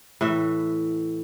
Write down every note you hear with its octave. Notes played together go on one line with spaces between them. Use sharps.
A2 E3 E5